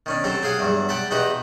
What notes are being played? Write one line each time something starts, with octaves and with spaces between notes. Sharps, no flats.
D#3 C#4 D4
F#3 C4 G4 A4
G4 G#4 F5 F#5 G#5
E2 G2 F#3
D5 F#5 G5 A5 B5
E2 D#4 F#4 G4 B4